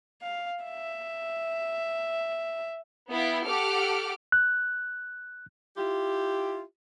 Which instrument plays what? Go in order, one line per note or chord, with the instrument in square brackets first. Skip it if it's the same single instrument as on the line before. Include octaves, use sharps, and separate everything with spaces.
[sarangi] F5
E5
[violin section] B3 E4 F5 G5
G4 A4 F#5 D6 F6
[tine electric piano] F#6
[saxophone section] E4 F4 G4